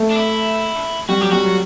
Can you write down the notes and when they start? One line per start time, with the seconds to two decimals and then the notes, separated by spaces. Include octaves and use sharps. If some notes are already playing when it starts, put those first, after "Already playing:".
Already playing: A3
0.11 D4
0.16 E4
1.09 G3 F#4
1.21 F#3 G4
1.32 G3 F#4
1.45 F#3